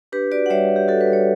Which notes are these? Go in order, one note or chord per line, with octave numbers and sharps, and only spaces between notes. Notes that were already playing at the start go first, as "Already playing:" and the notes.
D4 G4 B4
F#4 B4 D5
F#5
G3 C#5 E5
G3
G4
F#4 A4
B4
G3
C#5